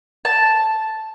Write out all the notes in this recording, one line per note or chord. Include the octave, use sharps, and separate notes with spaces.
A5